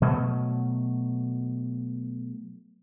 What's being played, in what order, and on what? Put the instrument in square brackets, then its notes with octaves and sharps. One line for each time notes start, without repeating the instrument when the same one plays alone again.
[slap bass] B2 F#3 A3